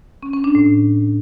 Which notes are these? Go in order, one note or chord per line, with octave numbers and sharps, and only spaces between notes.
C#4
C#4
D4
A2